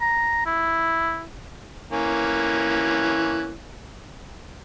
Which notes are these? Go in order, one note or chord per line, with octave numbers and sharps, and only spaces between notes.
A#5
E4
E3 A#3 C#4